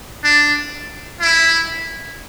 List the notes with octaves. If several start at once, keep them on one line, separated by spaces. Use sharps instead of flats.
D4
E4